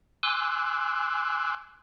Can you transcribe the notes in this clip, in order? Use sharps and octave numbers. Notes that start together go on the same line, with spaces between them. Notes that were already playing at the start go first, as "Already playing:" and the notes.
G#5 C6 D6 E6 F#6